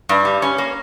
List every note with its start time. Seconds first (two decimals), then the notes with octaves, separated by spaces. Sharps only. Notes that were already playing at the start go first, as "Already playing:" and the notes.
0.09 G2
0.25 G3
0.42 C#4
0.58 A#3